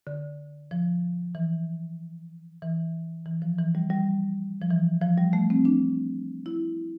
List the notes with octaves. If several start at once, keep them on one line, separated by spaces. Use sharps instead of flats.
D3
F3
E3
E3
E3
F3
E3
G3
G3
F3
E3
F3
G3
A3
C4
D4
E4